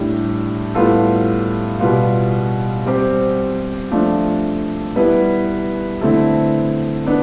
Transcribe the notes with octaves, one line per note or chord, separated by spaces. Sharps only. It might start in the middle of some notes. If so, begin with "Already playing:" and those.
Already playing: A2 G3 D4 G4
A2 G3 B3 F4 A4
B2 G3 B3 F4
G3 C4 G4 C5
F3 A3 D4 F4
G3 B3 E4 B4
D3 A3 C4 E4 A4
B3 D4